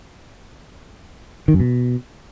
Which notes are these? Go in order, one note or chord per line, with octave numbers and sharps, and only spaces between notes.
D#3
F#2
B2